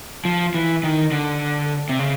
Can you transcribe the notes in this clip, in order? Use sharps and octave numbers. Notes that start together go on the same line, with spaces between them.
F3
E3
D#3
D3
C3
C#3